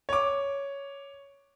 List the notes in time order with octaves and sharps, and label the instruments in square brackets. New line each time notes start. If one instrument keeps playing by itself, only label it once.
[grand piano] C#5 D6